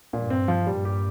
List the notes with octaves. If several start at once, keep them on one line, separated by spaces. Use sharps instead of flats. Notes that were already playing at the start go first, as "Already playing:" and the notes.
G2 A#2
C4
F3
G2 A#2 G3
G4